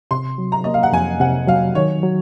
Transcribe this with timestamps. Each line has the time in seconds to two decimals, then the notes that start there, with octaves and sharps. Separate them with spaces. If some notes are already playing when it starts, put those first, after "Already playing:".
0.11 C3 C6
0.38 F#3
0.52 A#5
0.64 A#3 D#5
0.74 F5
0.83 F#5
0.93 F2 G#5
1.20 C3 F#5
1.48 F#3 F5
1.75 D#3 C#5
2.03 F#3